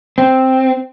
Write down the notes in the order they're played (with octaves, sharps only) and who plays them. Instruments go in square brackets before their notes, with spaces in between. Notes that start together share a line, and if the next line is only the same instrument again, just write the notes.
[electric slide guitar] C4